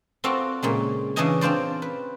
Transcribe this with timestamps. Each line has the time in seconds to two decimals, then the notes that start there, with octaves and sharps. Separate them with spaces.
0.24 C4 F4 F#4 A4 D5 F5
0.63 A#2 C#3 G#3
1.16 C#3 E3 D4 G#4 D#5 G#5
1.41 C4 D4 F4 C5 D5
1.82 B4